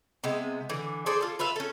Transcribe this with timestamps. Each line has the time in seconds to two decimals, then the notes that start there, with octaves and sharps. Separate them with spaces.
0.24 C3 G#3 B3
0.70 D3 E3
1.06 G#4 A4 C5 D5
1.21 F4 A4
1.39 F4 B4 E5 F5
1.56 C#4 A4